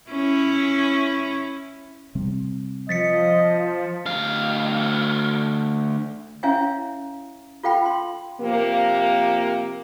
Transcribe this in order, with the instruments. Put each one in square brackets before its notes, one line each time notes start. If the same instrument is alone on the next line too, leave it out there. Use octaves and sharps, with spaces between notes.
[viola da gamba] C#4 E4
[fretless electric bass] C3 G3 C4
[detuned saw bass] F3 [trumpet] D#5 [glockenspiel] A6 B6 C#7
[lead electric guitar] D2 F5
[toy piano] C#4 E4 C#5 E5 F5 G#5
F4 A4 F5 G5 B5
C6
[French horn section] C3 F3 A#3